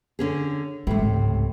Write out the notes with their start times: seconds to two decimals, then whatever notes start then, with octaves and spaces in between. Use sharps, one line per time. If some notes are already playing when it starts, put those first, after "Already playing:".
0.19 D3 C#4 G#4
0.87 A2 C3 G#3 F4
0.99 C#2 G#2